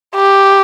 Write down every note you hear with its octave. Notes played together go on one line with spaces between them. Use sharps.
G4